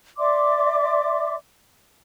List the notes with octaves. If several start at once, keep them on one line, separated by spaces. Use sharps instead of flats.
D5 E5 C6 D6